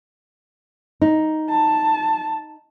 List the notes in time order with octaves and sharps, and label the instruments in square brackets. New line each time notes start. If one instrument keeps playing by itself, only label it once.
[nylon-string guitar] D#4
[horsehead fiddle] A5